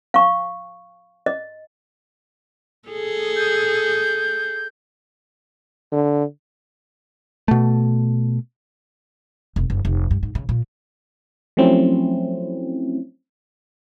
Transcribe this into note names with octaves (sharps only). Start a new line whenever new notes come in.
F5 C#6
D#5
G#4 A4
G6
D3
B2 A3
E1
F#1
F1
G2
G#2
C#3
A#2
F3 F#3 A3 C4 C#4 E4